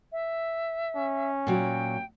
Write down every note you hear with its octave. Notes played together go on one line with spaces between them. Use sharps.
E5
C#4
A#2 F#3 F#4 G5